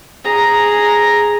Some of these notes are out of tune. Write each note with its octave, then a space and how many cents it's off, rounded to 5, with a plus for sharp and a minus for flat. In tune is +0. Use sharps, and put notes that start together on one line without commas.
G#4 +0 A#5 +0